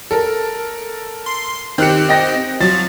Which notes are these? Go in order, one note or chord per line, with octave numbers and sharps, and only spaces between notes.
A4 A#4
C6
D#3 C4 G4 F#6 C#7
D#5 G5 A#6
F3 F#3 A6